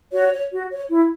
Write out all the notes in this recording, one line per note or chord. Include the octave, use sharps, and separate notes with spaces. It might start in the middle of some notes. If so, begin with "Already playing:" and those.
F#4 C#5
C#5
F#4
C#5
E4